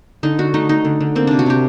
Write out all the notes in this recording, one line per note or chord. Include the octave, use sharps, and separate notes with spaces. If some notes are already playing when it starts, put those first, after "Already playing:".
D3 D#4
D3 F#4
A3 D#4
A3 D#4
D3
D3
A#3 C4
C3 D4
F#4
C3 G4